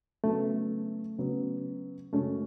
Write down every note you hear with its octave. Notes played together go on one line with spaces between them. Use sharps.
C#3 F#3 A3 B3
C#3 F#3 B3
F#2 C#3 G#3 A3 C#4 F#4